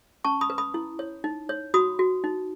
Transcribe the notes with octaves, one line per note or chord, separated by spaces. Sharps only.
C#4 A5 C#6
B5 D#6
B4
B5 D#6
E4
C#5
D#4
C#5
F#4 B5 D#6
F#4
D#4